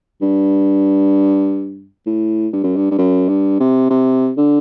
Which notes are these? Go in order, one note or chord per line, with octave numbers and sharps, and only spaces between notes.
G2
A2
G2
F#2
G2
G2
F#2
G2
C3
C3
D3